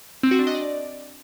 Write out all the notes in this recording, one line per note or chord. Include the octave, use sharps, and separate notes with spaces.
C4
F#4
D4
D#5
D5